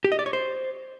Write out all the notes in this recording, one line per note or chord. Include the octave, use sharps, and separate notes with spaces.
G4
D#5
D5
C#5
C5